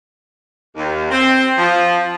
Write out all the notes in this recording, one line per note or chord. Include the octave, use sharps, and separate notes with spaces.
D#2
C4
F3